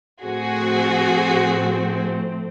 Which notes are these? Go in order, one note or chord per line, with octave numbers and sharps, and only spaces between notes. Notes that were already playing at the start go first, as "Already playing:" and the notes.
A2 F3 A3 C4 F#4 G#4